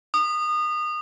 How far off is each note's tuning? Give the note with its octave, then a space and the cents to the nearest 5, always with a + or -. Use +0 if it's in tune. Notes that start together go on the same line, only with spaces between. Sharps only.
D#6 -25